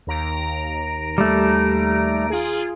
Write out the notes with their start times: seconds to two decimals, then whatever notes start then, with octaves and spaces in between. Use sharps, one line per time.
0.07 D#2 A#5 D7
1.18 G3 A3
2.30 F4 G#4